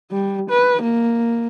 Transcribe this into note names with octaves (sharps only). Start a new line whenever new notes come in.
G3
B4
A#3